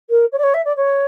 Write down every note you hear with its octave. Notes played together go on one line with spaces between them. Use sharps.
A#4
C#5
D5
C#5
E5
D5
C#5